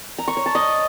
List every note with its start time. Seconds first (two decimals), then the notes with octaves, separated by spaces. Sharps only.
0.19 A#5
0.28 C#6
0.37 C#5
0.46 A5
0.55 D#5